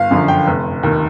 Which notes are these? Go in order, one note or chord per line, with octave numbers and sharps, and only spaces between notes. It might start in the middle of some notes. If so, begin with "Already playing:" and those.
Already playing: G1 F5
F#2 D3 F3
G5
F1
D#2 D#3